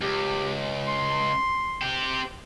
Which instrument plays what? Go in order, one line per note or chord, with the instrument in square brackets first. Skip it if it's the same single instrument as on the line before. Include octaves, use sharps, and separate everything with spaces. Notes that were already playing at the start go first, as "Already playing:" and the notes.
[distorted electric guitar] C#2 [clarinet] G4
[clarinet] C6
[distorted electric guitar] C4 G4